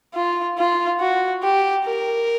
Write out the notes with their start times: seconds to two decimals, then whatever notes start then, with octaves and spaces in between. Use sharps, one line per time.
0.14 F4
0.58 F4
1.00 F#4
1.43 G4
1.85 A#4